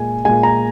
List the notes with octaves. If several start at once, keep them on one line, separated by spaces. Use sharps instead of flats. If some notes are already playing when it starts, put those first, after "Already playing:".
Already playing: A#2 G#3 G#5
A#2 G#3 G#5
A#5